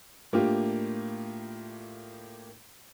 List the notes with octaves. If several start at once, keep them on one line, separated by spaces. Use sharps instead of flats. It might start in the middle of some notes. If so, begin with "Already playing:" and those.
A2 A#3 D4 F4 G4